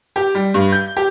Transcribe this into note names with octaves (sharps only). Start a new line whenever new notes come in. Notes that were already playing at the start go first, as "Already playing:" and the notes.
G4
G3
G2
G6
G4